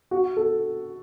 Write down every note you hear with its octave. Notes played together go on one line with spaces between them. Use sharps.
F#4
A4